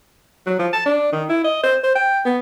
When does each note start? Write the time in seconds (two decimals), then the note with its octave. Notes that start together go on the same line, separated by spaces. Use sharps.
0.46 F#3
0.59 F3
0.73 A5
0.85 D4
1.13 D#3
1.29 E4
1.44 D#5
1.63 C5
1.84 C5
1.95 G5
2.25 B3